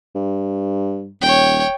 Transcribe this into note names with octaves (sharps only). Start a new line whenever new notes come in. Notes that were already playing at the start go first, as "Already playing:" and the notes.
G2
D#1 C#5 G5